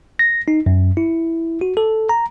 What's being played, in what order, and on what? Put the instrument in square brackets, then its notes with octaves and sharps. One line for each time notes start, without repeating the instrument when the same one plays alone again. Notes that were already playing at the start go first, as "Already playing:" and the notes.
[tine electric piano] A#6
D#4
F#2
E4
F#4
A4
A#5